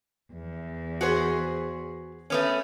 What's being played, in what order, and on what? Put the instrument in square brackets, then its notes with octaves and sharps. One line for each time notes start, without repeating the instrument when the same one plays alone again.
[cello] E2
[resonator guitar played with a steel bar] F#4 G#4 C5
A3 B3 C#4